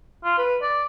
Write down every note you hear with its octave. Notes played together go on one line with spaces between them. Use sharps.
F4
B4
D5